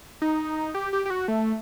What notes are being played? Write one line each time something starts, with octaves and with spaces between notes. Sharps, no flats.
D#4
G4
G4
G4
F#4
A3